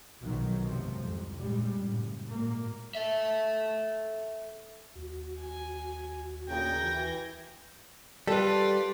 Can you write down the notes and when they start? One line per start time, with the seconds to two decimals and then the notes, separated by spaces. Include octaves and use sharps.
0.21 B1 D#3 F3 F#3
0.64 G#1 F#2 C3 F3
1.02 C2 F2
1.37 G2 A#2 C#3 G3 G#3
1.78 F#1 A2
2.29 G#1 A#2 A#3
2.95 A4 E5
4.95 D#2 F#4
5.40 G#5
6.48 D2 A#2 C#3 G5 G6 G#6 A#6
6.83 E3
8.28 G3 F4 A4 B4 D5